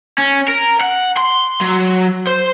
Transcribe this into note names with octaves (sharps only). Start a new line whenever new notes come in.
C#4
A#4
F#5
C6
F#3
C5